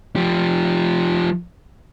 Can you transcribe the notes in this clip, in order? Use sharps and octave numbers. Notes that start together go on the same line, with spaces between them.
F3 G4